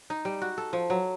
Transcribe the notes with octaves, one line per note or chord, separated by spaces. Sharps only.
D#4
G3
F#4
A4
F3
F#3